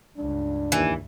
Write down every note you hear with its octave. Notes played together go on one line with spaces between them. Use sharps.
C#2 G2 D4
D#2 E3